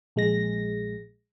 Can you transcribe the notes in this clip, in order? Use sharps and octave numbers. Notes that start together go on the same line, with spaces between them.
A#1 G#3 A#6